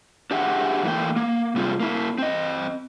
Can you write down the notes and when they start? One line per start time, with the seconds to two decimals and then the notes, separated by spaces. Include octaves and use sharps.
0.31 D4 G4 G#4 E5 F#5
0.84 E2 E3 A3 A#3 G5
1.16 A#3
1.56 C3 G3 G#3 C4 F4
1.80 A#3 E4
2.18 C4 D#5